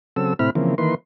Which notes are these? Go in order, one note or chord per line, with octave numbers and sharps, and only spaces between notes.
C#3 F#3 C4 A4 E6
A2 C3 C4 E4 B5 F6
C#3 E3 F3 A#3 C4
D#3 E3 A#3 B4 C6